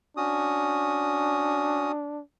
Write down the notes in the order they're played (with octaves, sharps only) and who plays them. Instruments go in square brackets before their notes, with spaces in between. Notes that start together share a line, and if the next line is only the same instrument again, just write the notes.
[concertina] C#4 F#4 D#6 [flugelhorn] D4